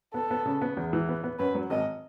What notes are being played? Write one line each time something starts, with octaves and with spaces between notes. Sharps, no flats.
B3 A4
B3
C#3
B3
E2
E3
B3
B3
F#2 B4
F#3
G#1 D#5